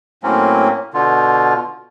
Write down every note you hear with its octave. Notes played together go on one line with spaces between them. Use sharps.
A2 F#3 A#3 C4 C#4
B2 D3 F4